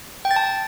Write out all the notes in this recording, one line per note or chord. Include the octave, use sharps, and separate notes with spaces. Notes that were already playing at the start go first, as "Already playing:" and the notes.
G5
A6
A5